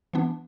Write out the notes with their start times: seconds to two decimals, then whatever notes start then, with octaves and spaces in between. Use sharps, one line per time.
0.13 E3 B3 D4